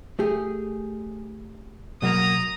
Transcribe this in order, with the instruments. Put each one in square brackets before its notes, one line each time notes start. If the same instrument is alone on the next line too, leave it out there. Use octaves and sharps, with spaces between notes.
[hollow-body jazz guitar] A3 G4 G#4
[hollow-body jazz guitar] B2 F#3 A#3 [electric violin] A#5 D#6